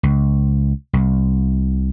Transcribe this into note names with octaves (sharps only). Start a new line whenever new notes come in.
C#2
C2